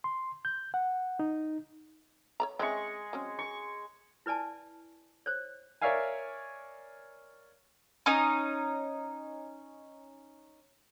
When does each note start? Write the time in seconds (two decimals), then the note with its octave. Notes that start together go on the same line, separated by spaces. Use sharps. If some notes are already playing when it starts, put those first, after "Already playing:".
0.04 C6
0.45 G6
0.74 F#5
1.19 D#4
2.40 C#5 D5 A#5
2.59 G#3 C4 C#4 E5 C#6
3.13 F#3 C4 C#4
3.39 C#6
4.26 E4 B4 D5 G#5 A5
5.26 C5 C#5
5.81 A#4 C#5 D5 E5 F5 G#5
8.06 C#4 D#4